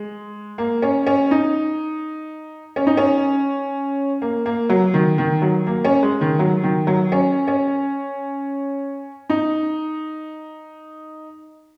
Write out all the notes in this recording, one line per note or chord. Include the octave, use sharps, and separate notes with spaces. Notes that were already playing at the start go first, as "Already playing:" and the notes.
Already playing: G#3
A#3
C#4
C#4
D#4
C#4
D#4
C#4
A#3
A#3
F#3
D#3
D#3
F#3
A#3
C#4
G#3
D#3
F#3
D#3
F#3
C#4
C#4
D#4